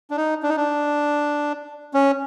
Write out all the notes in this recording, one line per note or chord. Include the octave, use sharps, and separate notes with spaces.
D4
D#4
D4
D#4
D4
C#4